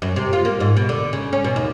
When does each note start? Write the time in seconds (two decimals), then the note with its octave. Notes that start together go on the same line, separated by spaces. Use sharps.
0.02 F#2
0.16 C3
0.33 F4
0.45 A#3
0.60 G#2
0.77 B2
0.89 D3
1.13 C#3
1.33 C#4
1.44 B2
1.56 D#2